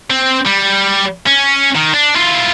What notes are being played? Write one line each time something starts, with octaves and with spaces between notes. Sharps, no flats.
C4
G3
C#4
D#3
D4
E4 F4